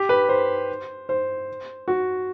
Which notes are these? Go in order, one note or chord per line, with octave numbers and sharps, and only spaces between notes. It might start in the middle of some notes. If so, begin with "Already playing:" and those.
Already playing: G4
B4
C5
C5
F#4